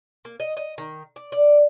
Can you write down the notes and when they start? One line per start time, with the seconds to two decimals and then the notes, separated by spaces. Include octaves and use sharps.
0.25 A#3
0.40 D#5
0.57 D#5
0.78 D#3
1.16 D5
1.32 D5